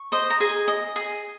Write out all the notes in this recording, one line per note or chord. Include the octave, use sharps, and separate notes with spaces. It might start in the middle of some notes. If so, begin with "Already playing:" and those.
Already playing: C#6
C5 D#5
A#5
G#4 G#5
D#5
G#4